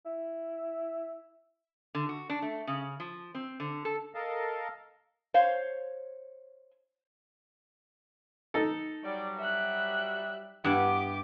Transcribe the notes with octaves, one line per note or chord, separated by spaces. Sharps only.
E4
D3
F#4
D4
A3
C#3
F3
C4
D3
A4
A4 A#4 D#5 F5 A5
C5 C#5 F5
D#4 A4
F#3 G3 D5
E5 F#6
G2 B3 E4 G4 F#5 D6